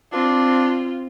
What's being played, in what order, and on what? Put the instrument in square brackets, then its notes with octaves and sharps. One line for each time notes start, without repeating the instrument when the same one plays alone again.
[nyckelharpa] C4 [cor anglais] D4 [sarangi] F4